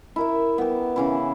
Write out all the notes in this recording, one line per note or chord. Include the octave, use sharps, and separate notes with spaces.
E4 A#4 E5
B3 G4
C#3 E3 E4